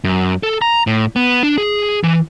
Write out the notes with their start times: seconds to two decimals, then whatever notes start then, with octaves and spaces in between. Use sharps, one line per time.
0.04 F#2
0.43 A4
0.62 A#5
0.87 A2
1.16 B3
1.43 D4
1.58 G#4
2.04 E3